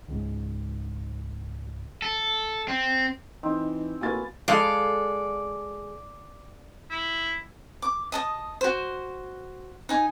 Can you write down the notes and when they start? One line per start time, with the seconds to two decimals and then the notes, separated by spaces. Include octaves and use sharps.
0.08 C#2 G#2
2.02 A4
2.68 C4
3.43 E3 C4 D#4
4.01 A2 A#3 F#4 B4 F5 G#5 A6
4.48 G#3 A4 D5 F5
6.90 E4
7.82 D6
8.12 D#5 A5 D#6
8.61 F#4 C5
9.89 D#4 G#5